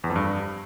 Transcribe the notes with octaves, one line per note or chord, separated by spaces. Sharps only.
E2
F2
G2